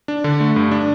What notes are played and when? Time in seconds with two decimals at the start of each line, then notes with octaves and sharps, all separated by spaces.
0.08 D4
0.24 D3
0.40 A3
0.56 G2
0.71 D4